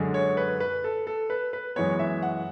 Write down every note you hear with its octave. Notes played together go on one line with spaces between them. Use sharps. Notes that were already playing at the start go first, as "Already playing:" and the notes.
Already playing: F#2 D3 G#3
C#5
B4
B4
A4
A4
B4
B4
F#2 E3 G#3 B3 C#5
E5
F#5